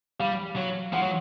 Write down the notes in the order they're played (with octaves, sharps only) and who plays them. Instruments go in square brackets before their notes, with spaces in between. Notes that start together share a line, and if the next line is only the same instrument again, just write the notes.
[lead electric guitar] G3 [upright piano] F5
[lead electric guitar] F#3
[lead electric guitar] F3 [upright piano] F#5
[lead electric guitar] F#3